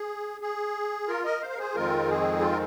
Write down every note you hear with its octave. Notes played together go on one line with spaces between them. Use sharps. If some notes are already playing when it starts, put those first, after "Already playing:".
Already playing: G#4
G#4
F4 A#4
A#4 D#5
C5 F5
A#4
G#4 C5
F2 D#3 G#3 C4 F4 A#4
G#4
F4
A#4